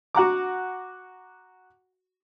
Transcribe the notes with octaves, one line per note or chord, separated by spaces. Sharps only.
F#4 F#5 A#5 D6